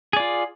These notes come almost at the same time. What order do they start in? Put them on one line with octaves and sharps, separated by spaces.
G#4 D5 F4